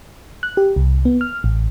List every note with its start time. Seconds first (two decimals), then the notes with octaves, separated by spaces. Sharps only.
0.43 F#6
0.57 G4
0.76 C2
1.05 B3
1.21 F6
1.44 A1